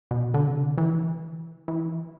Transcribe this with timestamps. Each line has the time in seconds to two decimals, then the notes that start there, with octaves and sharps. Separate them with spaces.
0.11 B2
0.34 D3
0.47 C3
0.60 D3
0.78 E3
1.68 E3